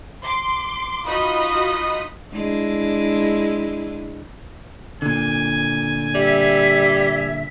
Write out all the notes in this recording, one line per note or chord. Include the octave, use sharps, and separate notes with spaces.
C6 D6
D#4 F4 F#4 D#5 B5 D#6
G#3 D4 E4
A#2 D3 G#5
G3 E5